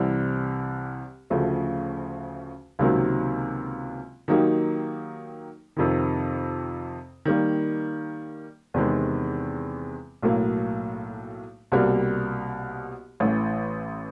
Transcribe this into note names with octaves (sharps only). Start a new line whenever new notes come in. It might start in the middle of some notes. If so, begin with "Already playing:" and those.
Already playing: C2 C3 E3 G3
D2 C#3 F3 A3
C#2 C3 D#3 F#3 A#3
D#3 F#3 A#3 D#4 G4
F2 C3 D#3
D#3 G3 A#3
E2 C3 D#3 G#3
B1 A2 F#3 A#3
C2 B2 G3 A#3
A1 A2 E3